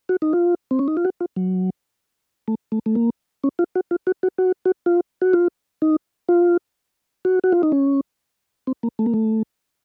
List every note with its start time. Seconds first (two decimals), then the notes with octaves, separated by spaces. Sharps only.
0.09 F#4
0.22 D#4
0.33 F4
0.71 C4
0.79 C#4
0.88 D#4
0.97 F4
1.05 F#4
1.20 F4
1.36 F#3
2.48 A3
2.72 A3
2.86 A3
2.95 A#3
3.44 C#4
3.59 F4
3.75 F#4
3.91 F4
4.07 F#4
4.23 F#4
4.38 F#4
4.65 F#4
4.86 F4
5.22 F#4
5.33 F4
5.82 D#4
6.29 F4
7.25 F#4
7.44 F#4
7.52 F4
7.63 D#4
7.72 C#4
8.67 C4
8.83 A#3
8.99 A3
9.06 A#3
9.14 A3